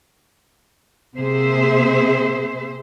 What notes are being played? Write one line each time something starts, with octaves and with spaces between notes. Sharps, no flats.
C3 A#3 G#4 C5 E5